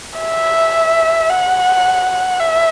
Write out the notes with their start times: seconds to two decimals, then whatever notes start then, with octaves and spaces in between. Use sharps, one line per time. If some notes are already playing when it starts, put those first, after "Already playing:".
0.19 E5
1.30 F#5
2.40 E5